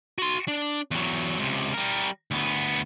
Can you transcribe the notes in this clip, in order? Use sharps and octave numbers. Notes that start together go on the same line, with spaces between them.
F#4 C6
D4
E2 F#3
C#2 C3
G3 A#4
D2 B3